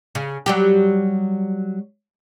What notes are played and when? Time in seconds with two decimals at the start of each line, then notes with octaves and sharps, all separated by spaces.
0.15 C#3
0.46 F#3 G3 G4